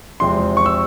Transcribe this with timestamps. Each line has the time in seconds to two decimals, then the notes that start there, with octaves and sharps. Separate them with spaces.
0.20 E2 C3 F3 G#3 C4 C6
0.57 C#6
0.66 E6